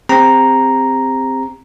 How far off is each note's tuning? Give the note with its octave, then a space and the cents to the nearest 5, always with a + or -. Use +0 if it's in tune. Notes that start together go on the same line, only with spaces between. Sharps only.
C4 +0 G4 +45 A#5 +0